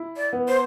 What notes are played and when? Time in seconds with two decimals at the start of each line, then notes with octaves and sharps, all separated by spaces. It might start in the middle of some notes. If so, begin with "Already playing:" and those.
Already playing: E4
0.17 D5
0.33 B3
0.48 C5